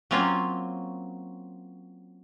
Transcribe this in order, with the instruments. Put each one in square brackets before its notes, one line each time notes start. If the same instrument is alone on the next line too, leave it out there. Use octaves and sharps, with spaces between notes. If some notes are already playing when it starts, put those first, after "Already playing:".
[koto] F#3 A#3 C4 C#4 F4